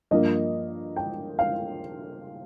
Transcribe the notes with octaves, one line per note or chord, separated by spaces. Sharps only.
G2 F3 A#3 D#5
G5
F5